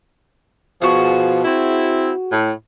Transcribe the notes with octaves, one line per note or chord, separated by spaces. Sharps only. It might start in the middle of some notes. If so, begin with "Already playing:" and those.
B2 F3 F#4 G#4
C4 E4
A2